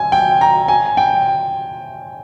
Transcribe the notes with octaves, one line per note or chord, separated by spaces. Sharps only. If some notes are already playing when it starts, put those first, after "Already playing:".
Already playing: G#5
G5
A#5
G#5
G5